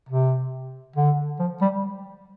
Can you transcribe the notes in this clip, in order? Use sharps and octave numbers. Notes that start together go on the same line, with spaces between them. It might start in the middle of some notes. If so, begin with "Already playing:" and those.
C3
D3
F3
G3